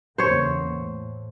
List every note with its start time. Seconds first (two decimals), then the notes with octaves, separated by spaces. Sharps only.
0.18 E2 C#3 A#3 C5 C#5
0.71 A2